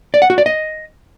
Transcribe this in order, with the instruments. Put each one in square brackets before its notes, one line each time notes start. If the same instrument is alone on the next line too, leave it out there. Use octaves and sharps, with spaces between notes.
[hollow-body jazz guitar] D5
F#5
F#4
D5
D#5